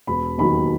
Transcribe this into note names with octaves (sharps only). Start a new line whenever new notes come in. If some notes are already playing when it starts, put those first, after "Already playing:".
E1 B5
D#2 D#3 F#3 B5